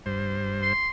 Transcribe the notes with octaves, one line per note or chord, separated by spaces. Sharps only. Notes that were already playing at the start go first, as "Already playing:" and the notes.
G2 C5
C6